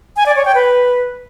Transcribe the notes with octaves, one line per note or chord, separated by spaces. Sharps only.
G#5
D5
C#5
G5
B4